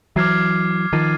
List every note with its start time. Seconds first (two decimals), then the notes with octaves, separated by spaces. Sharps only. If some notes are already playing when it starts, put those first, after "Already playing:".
0.16 E3 F#3 D6 F6 G#6 C7
0.93 D#3 F3 A6 C7 D#7